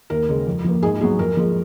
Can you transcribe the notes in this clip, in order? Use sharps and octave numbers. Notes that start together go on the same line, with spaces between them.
D#2 A#4
C#3 G#3
F2
F3 A#3
G#2 G#4
F#3 B3 G#4
F2 A#4
F3 G#3